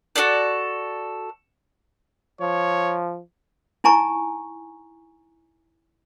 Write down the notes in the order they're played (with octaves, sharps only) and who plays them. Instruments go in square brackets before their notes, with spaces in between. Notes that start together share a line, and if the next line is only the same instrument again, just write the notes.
[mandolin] F#4 G#4 A4 D5
[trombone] F3 [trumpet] C#5
[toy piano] D#4 E4 G#5 A#5 C#6